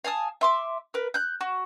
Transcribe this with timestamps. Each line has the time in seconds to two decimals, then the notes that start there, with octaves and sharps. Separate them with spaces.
0.05 F5 G#5 A5 D#6
0.41 E5 C6 D6
0.94 A#4 B4
1.14 F#6 G6
1.41 F#4